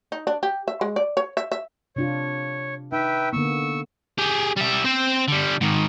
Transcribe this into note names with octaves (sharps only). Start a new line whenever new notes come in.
D#4
D4
G4
E5
G#3
D5
C#5
E5
E5
C3 D4 F4 C#5
D#4 B4 E5 G5
D3 A#3 B3 C#6 E6
G4 G#4
G3 E5
C4 C5
D3 G3
G#2 D#3